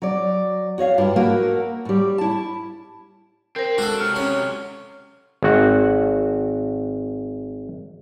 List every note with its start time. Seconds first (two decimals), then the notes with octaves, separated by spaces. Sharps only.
0.02 F#3 D5
0.78 F#4 C#5 D#5 F5
0.98 G2 E4 F4
1.16 A3 A#3 F#4 A#4
1.85 A2 G3
2.18 E4 A5
3.56 C4 A#4 C5
3.78 G#3 D4 F#4 A4
4.00 C3 F#3 F6
4.16 C#4
5.43 G#1 F#4